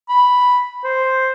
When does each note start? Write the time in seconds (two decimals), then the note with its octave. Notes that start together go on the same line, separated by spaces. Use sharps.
0.09 B5
0.84 C5